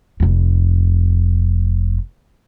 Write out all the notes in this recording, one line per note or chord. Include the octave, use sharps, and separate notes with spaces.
F1 F2